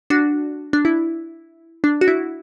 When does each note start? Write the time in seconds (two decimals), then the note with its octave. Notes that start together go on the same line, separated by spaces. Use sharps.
0.10 D4 F#4
0.73 D4
0.85 E4
1.84 D4
2.01 F#4
2.08 E4